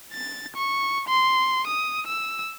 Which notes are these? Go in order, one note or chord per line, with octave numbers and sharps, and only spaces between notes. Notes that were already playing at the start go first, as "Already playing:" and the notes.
A6
C#6
C6
D#6
E6